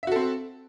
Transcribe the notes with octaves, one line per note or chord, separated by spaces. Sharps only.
C4 F#4 A4 E5